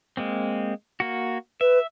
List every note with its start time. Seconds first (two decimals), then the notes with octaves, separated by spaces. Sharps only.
0.17 G#3 A#3 C4
1.00 A#3 F#4
1.61 B4 E5